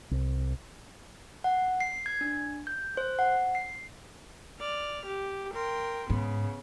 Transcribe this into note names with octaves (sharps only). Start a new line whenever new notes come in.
C2
F#5
C7
G#6
D4
G6
C5
F#5
C7
D5 F6
G4
A#4 G5 C6
G#2 C#3 B3